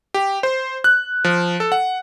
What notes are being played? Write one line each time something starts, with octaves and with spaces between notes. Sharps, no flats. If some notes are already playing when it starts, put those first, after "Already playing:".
G4
C5
F#6
F3
A4
F#5